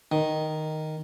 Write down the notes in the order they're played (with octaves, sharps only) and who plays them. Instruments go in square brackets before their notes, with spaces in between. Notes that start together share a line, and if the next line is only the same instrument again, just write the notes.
[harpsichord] D#3